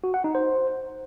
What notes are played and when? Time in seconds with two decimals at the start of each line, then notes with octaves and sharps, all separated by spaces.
0.04 F#4
0.14 F#5
0.24 D#4
0.35 C5